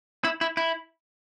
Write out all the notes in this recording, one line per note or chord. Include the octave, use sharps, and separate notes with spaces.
E4
E4
E4